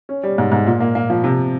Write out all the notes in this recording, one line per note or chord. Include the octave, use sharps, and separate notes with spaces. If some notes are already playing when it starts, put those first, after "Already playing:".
C#4
G3
G#2
G#2
A#2
A#3
A#3
F3
C3